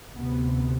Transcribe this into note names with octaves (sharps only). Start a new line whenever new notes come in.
D2 C3 B3